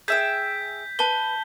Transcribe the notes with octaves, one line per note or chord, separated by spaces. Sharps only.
G#4 E5 G5 G6 B6
B4 A5 G7